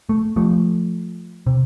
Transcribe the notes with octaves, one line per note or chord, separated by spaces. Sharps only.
A3
F3 A3
C3